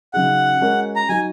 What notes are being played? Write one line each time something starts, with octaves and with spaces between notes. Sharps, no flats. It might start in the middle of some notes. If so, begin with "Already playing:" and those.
C#3 F#3 D#4 G#4 F#5
G#3 C#4 F#4 A#4
A#5
F#3 D#4 F#4 G#5